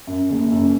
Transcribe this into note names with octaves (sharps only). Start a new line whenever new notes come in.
F#2
F#1
F#2